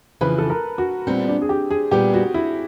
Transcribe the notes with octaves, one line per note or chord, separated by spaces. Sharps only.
F2 C#3 E3 B4
A4
A#4
F#4
A#2 G3 B3 C4
D4
G#4
G4
G#4
A#2 G3 B3 G4
F#4
E4